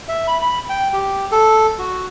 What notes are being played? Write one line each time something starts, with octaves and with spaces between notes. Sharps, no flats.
E5
B5
B5
G5
G4
A4
F#4